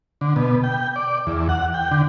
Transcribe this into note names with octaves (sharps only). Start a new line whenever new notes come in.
D3
B2
G5
D5
E2
F#5
G5
D3